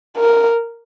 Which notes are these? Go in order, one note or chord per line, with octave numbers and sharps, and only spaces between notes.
A#4